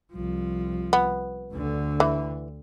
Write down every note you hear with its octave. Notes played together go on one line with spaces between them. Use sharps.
C2 F3
B3
D2 D3
E3